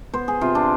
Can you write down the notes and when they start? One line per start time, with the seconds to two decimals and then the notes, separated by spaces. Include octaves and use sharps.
0.13 B3 C5
0.28 G#4
0.41 C3 F4
0.55 D4